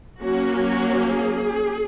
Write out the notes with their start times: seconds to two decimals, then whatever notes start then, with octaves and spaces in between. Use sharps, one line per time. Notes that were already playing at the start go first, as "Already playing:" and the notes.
0.21 F#3 A#3 C#4 F#4
0.67 F#4
1.14 G#4